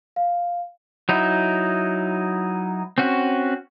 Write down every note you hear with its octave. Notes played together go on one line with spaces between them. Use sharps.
F5
F#3 D#4 E4
C4 C#4 F#4